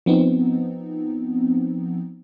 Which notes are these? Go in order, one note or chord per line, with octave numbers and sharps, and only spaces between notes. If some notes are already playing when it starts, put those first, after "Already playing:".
F3 B3 C4 D#4